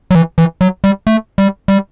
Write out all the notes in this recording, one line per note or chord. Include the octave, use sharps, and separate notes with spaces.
F#3
E3
E3
F#3
G3
A3
G3
G3